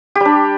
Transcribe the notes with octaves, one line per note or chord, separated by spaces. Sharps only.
G3 D4 G4